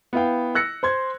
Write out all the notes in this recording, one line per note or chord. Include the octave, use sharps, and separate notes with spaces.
B3 E4 F5 G5
E6 F#6 A#6 C#7
C5 C6 G#6